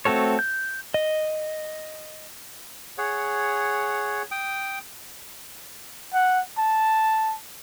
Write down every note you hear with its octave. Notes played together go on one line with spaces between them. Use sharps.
A3 C4 F#4 A4 C#5
G6
D#5
G#4 C#5 F#5
G5 D#6
F#5
A5